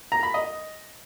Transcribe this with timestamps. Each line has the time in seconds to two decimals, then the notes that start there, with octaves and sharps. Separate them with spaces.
0.12 A#5
0.23 B5
0.34 D#5